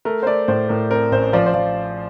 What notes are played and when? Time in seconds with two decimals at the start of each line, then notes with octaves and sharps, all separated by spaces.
0.05 A3 A#4
0.23 C5
0.26 A3 D5
0.48 A2 C5
0.69 A2 A#4
0.90 C4 A#4
1.12 A1 C5
1.33 F3 D5
1.46 C5
1.54 F3 D5